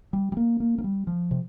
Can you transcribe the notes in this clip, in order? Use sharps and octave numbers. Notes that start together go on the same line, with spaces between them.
G3
G3
A#3
A#3
A#3
G3
F3
C3